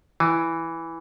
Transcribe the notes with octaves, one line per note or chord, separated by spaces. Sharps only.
E3